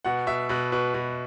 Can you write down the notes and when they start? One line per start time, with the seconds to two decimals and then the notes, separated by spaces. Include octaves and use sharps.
0.05 B2 F#5
0.27 B2 E5
0.49 B2 B4
0.72 B2 B4
0.94 B2